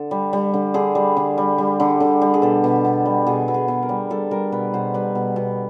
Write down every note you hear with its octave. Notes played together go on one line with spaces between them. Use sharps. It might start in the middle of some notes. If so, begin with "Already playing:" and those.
Already playing: D3 A4
G3
G3
D3
D3 G#4
G3
D3
G3
G3
D3
D3
G3
G#4
B2 A4
B2
B2
G3
B2 G#4
B2
G#4
B2
A#4
G3
G3 A4
G3 A#4
B2 B4
B2 C5
G3 B4
B2
B2